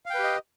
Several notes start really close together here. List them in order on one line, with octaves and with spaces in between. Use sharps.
F5 G5 B4 G4 D#5